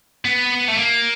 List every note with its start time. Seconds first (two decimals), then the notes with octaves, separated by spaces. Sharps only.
0.25 B3
0.68 A3
0.77 A#3